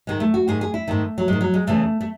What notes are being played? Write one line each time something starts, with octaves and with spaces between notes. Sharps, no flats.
G#2 D#3 G#3
A3
F#4
G#2 D#3 G#4
G#4
E4
G#2 D#3 A3
F#3
G#2 D#3 G#3
F#3
G#3
E2 C#3 E3 A3
A3